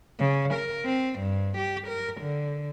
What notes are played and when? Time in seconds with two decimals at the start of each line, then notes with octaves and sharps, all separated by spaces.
0.19 C#3
0.53 A#4
0.85 C4
1.19 G2
1.57 G4
1.87 A#4
2.21 D3